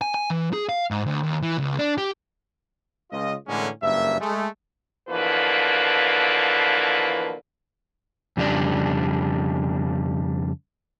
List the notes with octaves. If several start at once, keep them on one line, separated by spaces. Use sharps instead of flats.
G#5
G#5
E3
G#4
F5
G#2
D2
D#2
E3
C#2
D4
G4
C#2 F4 D#5
A2 D3 E3 G#3 A#3 C#4
F#1 G2 A#3 E5
G#3 A3
B2 D3 E3 F3 A#3 B4
F2 C#3 G3 D4 D5